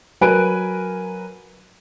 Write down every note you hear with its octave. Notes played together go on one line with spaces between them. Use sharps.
F#3 A#4 B4 G#5 D7